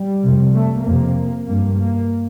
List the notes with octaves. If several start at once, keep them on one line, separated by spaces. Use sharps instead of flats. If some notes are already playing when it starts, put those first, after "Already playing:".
Already playing: G3
F2 C3
A3
F2 C3 A#3
G2 A#3
A#3